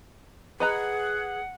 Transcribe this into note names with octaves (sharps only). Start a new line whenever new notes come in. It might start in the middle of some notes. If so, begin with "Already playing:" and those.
G#4 B4 D#5 F#5 A#5